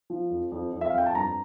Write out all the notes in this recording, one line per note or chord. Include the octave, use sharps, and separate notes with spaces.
F3
F2
F2
F2
E5
F5
F2 G5
A5
G2 A#5